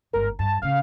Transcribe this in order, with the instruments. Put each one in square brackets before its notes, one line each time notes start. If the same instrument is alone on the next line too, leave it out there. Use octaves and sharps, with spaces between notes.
[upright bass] G1 G#2 [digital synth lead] A#4
[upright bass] G2 [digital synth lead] A5
[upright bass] A2 C#3 [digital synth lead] F5